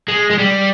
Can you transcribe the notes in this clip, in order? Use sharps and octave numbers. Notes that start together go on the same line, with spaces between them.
G#3
G#3
G3